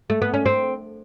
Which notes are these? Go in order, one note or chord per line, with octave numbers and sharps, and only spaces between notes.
A3
B3
C#4
C4